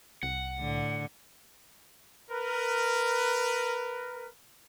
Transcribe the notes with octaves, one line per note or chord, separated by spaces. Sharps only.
C2 F#5
A2 D3
A#4 B4